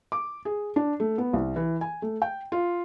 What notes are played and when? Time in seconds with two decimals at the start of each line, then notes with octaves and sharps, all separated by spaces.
0.12 D6
0.45 G#4
0.76 D4
1.00 A3
1.18 B3
1.33 C2
1.56 E3
1.81 G#5
2.02 A3
2.22 G5
2.52 F4